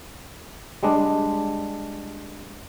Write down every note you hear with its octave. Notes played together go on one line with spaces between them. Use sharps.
G3 G#3 D4